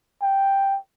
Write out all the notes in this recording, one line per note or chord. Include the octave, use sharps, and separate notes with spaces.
G5